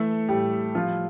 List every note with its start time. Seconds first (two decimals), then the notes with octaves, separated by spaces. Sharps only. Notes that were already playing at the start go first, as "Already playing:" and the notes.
Already playing: E3 A3 A4
0.29 A2 G3 G4
0.75 F3 G3 F4